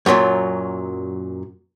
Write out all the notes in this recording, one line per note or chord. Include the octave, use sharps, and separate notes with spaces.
F#2 A#2 E3 F#3